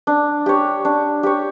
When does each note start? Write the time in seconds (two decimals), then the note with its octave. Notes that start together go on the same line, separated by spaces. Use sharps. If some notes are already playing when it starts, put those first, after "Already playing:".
0.07 D4
0.46 G4 C#5
0.85 D4
1.23 G4 C#5